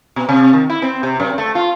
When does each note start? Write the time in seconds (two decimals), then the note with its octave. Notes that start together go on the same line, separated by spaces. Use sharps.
0.16 B2
0.29 C3
0.53 D#3
0.70 E4
0.82 C4
1.03 C3
1.20 F#2
1.38 A3
1.55 F4